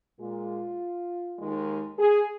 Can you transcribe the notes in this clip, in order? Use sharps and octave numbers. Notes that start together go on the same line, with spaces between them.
A#2 G#3 F4
D#2 D#3 G#3
G#4